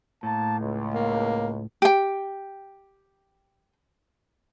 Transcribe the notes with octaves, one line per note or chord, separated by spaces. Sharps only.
A2 A#3 A5
C#2
A#3
G4 G5